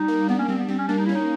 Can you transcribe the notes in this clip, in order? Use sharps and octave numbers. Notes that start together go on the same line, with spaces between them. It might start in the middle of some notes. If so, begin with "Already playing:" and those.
Already playing: G3 D#4
A#3
B3 D4
C#4
G3 C4
B3
G3 C4
C#4
A#3 D4
D#4
E4
C#4
D#4